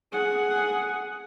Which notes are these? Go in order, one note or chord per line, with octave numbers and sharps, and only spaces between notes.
G#4 F#5